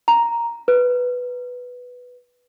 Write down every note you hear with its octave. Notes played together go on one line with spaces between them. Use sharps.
A#5
B4